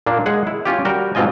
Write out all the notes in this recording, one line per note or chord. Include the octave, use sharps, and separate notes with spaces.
A#2 A#3 D4
G#3 G#4 F#5
E4
C#4 F4 G4
G3 F#4 A#4 G5
G#2 B2 C4 F4 D#5 G#5